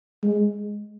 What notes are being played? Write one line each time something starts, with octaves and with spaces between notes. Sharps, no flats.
G#3